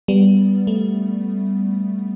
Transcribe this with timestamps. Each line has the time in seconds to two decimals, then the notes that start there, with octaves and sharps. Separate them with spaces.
0.08 G3 B3
0.67 A3